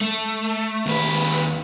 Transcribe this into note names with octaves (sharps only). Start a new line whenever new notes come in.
A3
D#2 B4